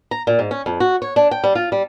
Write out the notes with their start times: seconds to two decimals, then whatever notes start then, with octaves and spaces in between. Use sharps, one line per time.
0.11 A#5
0.27 A#2
0.39 G#2
0.51 C#4
0.66 F2
0.80 F#4
1.02 C#5
1.16 D4
1.31 G5
1.44 G3
1.55 F4
1.72 G3